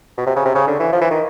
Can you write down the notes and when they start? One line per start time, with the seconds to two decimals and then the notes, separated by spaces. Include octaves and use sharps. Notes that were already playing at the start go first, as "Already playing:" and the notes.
0.18 B2
0.27 C3
0.36 C#3
0.45 C3
0.55 C#3
0.67 D3
0.80 E3
0.93 F3
1.01 E3
1.10 D#3